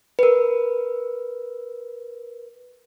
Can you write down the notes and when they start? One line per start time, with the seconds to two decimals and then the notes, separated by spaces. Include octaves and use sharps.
0.19 A#4 B4